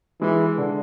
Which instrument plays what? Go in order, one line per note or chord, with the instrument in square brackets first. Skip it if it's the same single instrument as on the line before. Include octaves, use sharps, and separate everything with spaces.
[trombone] E3 [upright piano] G#3
[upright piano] D3